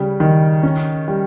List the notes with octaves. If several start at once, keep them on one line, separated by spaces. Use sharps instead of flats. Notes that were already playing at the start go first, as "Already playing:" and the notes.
Already playing: C#3 G3
D#3
C#4
G3